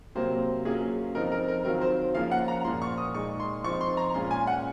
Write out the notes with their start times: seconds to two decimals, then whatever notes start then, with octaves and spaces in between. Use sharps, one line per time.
0.15 C3 F#3 A#3 C5
0.65 F#3 A#3 C#4 F4 G#4
1.15 F3 C4 D#4 A#4
1.32 A#4
1.48 A#4
1.65 D#3 F#3 C4 F4 A#4
1.81 C5
2.14 C#3 F3 A#3 C#4 F4 F5
2.31 F#5
2.48 A#5
2.64 A#2 F3 A#3 F4 C6
2.82 C#6
2.98 D#6
3.14 A#2 G#3 D#4 C#6
3.40 C6
3.64 F3 C4 D#4 C#6
3.81 C6
3.97 A#5
4.14 A#2 G#3 C#4 F4 C6
4.31 G#5
4.47 F#5